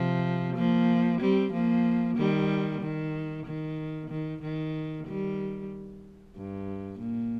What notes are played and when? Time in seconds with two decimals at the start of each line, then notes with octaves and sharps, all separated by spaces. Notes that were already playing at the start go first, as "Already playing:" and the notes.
Already playing: C3 F3
0.55 F3 A#3
1.20 G3 C4
1.53 F3 A#3
2.17 D#3 G3
2.81 D#3
3.46 D#3
4.10 D#3
4.42 D#3
5.07 D#3 G3
6.36 G2
7.00 A#2